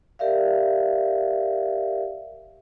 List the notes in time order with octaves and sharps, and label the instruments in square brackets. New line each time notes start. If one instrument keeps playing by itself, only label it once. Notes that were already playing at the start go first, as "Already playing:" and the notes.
[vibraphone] G4 A#4 D5 E5 F5